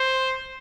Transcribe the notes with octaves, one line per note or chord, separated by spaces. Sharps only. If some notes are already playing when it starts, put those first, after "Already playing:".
Already playing: C5